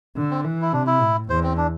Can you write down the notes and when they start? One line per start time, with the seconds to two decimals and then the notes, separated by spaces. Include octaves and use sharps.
0.17 D3
0.31 C4
0.45 E3
0.62 E4
0.73 C3 D4
0.87 E4
1.01 A2
1.29 E2 C5
1.43 C4
1.57 D4